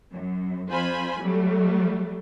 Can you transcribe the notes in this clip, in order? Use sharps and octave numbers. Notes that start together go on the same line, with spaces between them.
F#2
F2 F4 C5 G#5 B5
F#3 G3 A3